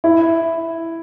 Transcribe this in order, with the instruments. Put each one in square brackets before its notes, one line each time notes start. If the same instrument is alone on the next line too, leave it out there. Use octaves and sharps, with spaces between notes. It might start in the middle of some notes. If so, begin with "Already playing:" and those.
[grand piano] E4